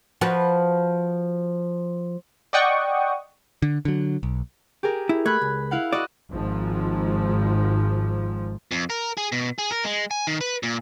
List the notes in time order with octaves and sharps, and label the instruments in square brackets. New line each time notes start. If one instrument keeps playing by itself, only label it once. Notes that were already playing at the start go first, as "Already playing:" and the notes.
[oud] F3 F#4 B4
[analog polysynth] D5 D#5 F#5 G5 C#6 D#6
[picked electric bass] D3
D3 F#3
B1
[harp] G4 G#4 A#4
[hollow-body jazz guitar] E4
[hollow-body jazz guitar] A3 [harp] B5 F#6 G#6
[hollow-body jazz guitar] C#2
[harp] E4 F5 F#5
[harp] F#4 D#5 F#5 [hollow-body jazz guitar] D5
[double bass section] G#1 G#2 F3
[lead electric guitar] F2
A#4
G#4
B2
G#4
A#4
G#3
G#5
D#3
B4
A#2